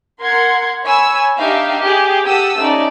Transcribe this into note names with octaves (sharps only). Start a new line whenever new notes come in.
A#4 F#5 C6 G#6
C#5 G#5 B5 E6
D4 D#4 G4 E5 F5
G4 G#4
G4 A4 F#5 D#6 E6
A3 C#4 D#4 D5